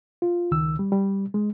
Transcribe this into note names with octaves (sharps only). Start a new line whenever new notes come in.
F4
C#2 D#3 E6
G3
G3
G#3